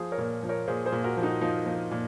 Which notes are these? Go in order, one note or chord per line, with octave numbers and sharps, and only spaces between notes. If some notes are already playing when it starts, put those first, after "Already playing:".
Already playing: F3 G#4 C5
A#4 C#5
A#2
F3
A#4 C#5
A#2 G#4 C5
G#4 C5
A#2
F#4 A#4
F3
D#4 F#4
F3 D#4
F3
A#2